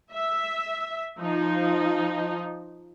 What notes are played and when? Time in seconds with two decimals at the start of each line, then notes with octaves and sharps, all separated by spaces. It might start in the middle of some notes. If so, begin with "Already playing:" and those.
0.12 E5
1.19 F3 D#4